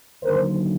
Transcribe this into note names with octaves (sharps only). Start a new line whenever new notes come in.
D#2 D3 F#3 A#4 C5